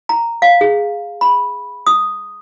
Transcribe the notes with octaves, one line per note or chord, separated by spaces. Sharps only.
A#5
F5
G#4
B5
D#6